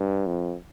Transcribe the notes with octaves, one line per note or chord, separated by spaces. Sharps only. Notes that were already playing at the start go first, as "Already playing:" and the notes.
Already playing: G2
F2